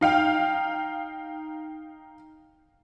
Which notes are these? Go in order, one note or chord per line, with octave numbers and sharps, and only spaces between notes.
D#4 F5 G5